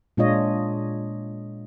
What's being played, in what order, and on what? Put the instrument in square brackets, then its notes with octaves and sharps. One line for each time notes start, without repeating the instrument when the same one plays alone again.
[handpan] A#2 G#3 D4 F4 C#5 D#5